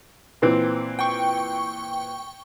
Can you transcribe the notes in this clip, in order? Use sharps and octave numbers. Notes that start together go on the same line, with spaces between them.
A#2 E3 C4
G5 C#6